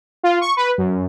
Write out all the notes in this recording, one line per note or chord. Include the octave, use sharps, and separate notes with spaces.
F4
C#6
B4
F#2